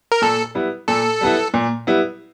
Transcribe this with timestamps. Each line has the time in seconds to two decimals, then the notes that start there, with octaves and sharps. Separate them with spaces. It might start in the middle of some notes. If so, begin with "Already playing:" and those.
0.12 A#4
0.22 A#2 A4
0.55 G3 B3 E4
0.88 A#2 A4
1.21 G3 B3 E4
1.54 A#2
1.87 G3 B3 E4